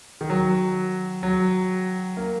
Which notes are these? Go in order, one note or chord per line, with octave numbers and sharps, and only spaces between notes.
D#3
F#3
F#3
A#3